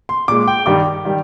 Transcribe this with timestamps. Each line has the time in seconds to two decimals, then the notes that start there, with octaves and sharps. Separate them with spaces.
0.09 C6
0.28 A#2 G#3 D6
0.48 G5
0.66 G2 D#3 G3 D6
1.05 D#3 G3